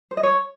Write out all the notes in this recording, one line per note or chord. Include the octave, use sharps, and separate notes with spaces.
C5
D#5
C#5